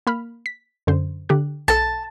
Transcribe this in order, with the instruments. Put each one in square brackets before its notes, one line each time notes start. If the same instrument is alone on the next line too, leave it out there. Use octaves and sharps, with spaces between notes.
[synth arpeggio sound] A#3 B5 F6
B6
F#2 D3 C5
D3 G4 F#6
[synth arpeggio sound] B1 A4 [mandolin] A5